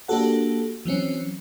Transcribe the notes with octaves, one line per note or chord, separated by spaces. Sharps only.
A#3 D4 F#4 G4 A4 F#5
E3 F#3 C4 C#4